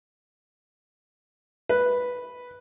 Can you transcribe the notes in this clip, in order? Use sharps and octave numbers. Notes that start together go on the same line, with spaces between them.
B4